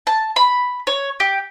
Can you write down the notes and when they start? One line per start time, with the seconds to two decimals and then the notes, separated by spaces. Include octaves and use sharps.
0.07 A5
0.36 B5
0.87 C#5
1.20 G4